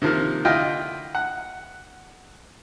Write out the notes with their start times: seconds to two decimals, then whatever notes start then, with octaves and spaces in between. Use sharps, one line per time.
0.02 C3 D#3 F3 A#3 F6
0.45 D3 E4 F4 D#5 G5 F6
1.15 F#5